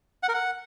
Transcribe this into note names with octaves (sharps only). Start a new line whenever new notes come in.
F#5
A#4
F#5